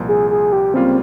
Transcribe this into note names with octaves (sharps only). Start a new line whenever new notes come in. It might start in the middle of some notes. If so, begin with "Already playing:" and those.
Already playing: C2 A#2 F3
G#4
G#4
G4
C#2 C#3 G3 A#3 C4 F4